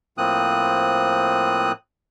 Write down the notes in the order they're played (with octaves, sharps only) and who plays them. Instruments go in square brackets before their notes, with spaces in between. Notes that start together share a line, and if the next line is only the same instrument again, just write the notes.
[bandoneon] A2 F3 A#3 C4 D#6 F#6